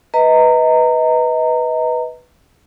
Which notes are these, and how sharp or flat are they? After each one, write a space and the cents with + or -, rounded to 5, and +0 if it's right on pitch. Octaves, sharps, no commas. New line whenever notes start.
B4 +0 D#5 +25 A#5 -25